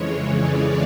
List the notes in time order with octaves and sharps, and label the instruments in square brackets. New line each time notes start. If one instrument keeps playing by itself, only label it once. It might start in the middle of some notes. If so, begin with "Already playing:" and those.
Already playing: [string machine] F2 C#3 E3 G#3 C#5
D5